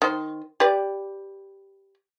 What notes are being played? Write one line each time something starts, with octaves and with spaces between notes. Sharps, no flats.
D#3 C5
G4 B4 D5